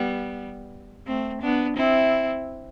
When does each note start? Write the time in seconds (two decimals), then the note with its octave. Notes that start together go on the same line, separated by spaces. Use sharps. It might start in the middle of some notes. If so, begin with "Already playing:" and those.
Already playing: G3 B3
1.07 A3 C4
1.42 B3 D4
1.77 C4 E4